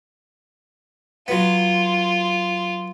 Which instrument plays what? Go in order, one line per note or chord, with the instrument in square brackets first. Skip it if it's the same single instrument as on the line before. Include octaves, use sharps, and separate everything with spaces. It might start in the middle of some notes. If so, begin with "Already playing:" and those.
[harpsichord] F#3 B3 [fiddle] F4